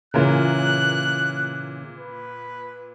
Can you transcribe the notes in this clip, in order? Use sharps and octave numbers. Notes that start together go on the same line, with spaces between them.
A#2 C#3 E3 A#4 F#6
B4